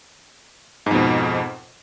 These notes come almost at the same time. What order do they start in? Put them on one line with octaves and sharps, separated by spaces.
G#2 F2 B2